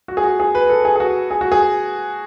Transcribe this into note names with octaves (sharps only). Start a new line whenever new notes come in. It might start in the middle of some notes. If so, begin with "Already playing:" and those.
F#4
G#4
F#4
G#4
B4
A4
G#4
G#4
F#4
G#4
F#4
G#4